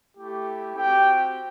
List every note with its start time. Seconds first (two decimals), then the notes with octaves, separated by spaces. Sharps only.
0.18 A3 E4 G4
0.76 C4 F#4 G4 G5